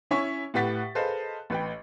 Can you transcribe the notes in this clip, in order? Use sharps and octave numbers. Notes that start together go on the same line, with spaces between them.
C#4 E4 C#5 E5 G#5 C#6
A2 G4 B4 F#5 A6 B6
G#4 A4 B4 C5 D#5 F5
A1 B4 G5